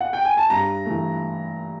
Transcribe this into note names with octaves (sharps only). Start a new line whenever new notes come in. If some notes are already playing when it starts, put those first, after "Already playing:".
F#5
G5
G#5
A5
G2 A#5
E3 A3